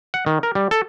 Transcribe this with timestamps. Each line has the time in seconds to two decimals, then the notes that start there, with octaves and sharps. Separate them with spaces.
0.14 F#5
0.26 D#3
0.43 A#4
0.55 G3
0.71 A4